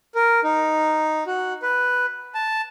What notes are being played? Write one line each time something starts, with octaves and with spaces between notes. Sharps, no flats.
A#4
D#4
F#4
B4
A5